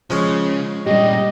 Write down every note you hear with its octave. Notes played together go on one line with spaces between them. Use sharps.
C#3 F3 G#3 C#4
A#2 C#3 G3 G4 D#5